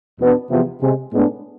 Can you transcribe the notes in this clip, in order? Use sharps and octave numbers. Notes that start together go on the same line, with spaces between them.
E2 B2 B3 D4
E2 C3 F3 B3
C3 G#3 C4
A2 G#3 B3 D4